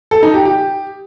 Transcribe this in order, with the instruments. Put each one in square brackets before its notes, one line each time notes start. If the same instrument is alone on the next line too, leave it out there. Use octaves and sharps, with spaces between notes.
[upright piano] A4
D#4
G4
G4